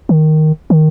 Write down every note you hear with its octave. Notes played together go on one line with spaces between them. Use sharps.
D#3
D#3